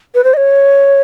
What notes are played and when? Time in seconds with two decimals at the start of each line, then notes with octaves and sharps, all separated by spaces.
0.15 B4
0.24 C5
0.34 D#5
0.37 C#5